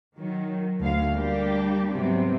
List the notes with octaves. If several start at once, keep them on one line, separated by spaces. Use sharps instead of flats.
D#3 F#3
D2 D3 F5
G3 A#3 D4 G4
G#2 C3 F#3 G3 B3 C4